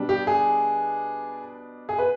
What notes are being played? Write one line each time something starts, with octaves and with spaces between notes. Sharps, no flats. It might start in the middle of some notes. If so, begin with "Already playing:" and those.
Already playing: B2 G3 D4
G4
G#4
G#4
B4